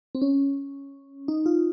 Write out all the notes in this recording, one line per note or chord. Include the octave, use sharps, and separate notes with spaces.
C4
C#4
D#4
F4